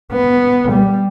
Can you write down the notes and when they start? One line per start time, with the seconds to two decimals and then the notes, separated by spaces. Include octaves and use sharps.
0.12 B3
0.71 G3